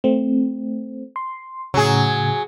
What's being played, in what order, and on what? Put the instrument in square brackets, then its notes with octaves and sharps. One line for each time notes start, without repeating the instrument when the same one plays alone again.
[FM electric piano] A3 C4
C6
[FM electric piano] A2 C#3 [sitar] F#3 G#4